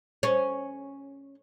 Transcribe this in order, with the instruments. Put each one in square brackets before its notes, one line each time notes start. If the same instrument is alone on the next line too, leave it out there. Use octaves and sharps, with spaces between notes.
[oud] C#4